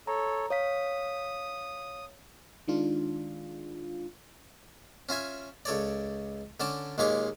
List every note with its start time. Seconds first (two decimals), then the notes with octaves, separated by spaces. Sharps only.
0.07 A4 C#5 A#5
0.50 C#5 F5 D#6 B6
2.68 D#3 G#3 D4 F4
5.09 C#4 F4 E5 G#5
5.65 C#2 A4 C#5 D5
6.60 D3 C#4 D5 A5
6.98 D#2 A#2 G#3 A#3 C#5 D6